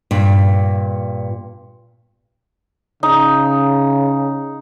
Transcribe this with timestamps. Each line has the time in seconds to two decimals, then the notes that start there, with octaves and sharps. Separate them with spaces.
0.11 G2 A#2
3.03 C#3 D#4